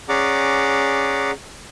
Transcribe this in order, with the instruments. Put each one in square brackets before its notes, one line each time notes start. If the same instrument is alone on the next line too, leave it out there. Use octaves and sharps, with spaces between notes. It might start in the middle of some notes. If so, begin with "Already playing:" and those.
[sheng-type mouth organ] C#4 G#4 D5 F#5 A#5 D6